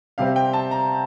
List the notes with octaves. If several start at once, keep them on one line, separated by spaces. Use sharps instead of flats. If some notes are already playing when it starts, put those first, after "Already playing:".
C3 G3 C4 F5
G5
A5
A#5